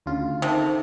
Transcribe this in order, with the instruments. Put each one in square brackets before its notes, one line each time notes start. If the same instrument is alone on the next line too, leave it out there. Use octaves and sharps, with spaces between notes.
[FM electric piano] D2 C#3 F4
[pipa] C3 [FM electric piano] D#3 A4